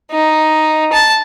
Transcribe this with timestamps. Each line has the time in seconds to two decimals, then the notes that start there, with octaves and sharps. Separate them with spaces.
0.12 D#4
0.93 A5